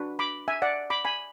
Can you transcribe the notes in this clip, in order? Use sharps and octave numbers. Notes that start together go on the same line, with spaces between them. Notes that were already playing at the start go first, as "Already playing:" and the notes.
Already playing: D4 F#4 B4
B5 D6
E5 G#5
D5 F#5
B5 D6
G#5 B5